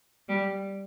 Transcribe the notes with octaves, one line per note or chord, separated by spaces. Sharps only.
G3